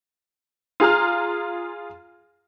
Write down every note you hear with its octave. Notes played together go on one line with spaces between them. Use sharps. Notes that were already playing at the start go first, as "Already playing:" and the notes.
F4 G#4 A#5 F6